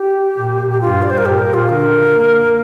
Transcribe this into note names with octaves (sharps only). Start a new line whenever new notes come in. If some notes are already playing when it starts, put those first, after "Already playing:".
Already playing: G4
A#2
G4
G2 F4
D5
C5
A#4
A#2 G4
A#4
F4
D3 A#4
A#3